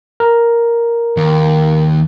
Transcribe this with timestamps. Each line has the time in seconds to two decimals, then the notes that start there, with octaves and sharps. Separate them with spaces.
0.20 A#4
1.17 D#2